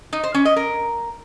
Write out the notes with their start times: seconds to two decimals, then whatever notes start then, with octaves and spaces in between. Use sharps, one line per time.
0.13 D#4
0.24 C5
0.34 C#4
0.45 D#5
0.56 A#4